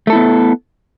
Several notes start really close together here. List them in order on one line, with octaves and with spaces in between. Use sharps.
A3 A4 E4 B3